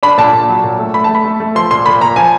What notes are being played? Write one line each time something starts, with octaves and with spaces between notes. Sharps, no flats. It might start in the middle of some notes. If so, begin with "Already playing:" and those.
D4 B5
A#2 A5
A#2
F#3
A#2
A3
A3 B5
A5
A3
B5
A3
A3
F3 C6
A#2 C6
A#2 B5
A#2 A#5
F3 G#5